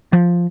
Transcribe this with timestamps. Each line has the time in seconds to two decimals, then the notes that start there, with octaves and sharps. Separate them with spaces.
0.13 F3